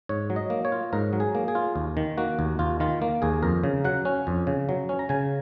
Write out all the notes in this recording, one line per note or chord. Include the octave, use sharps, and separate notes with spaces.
G#2 C#5
F#3
D#5
A#3
C#5
F4
G#2 A#4
F#3
G#4
A#3
G#4
F4
D#2
D#3
A#3 F#4
D#2
D#2 F4
D#3 F4
A#3
D#2 G#4
F2 A#4
C#3
F#3 F#5
C#4
F2
C#3
F#3
C#4
A#5
C#3 G#5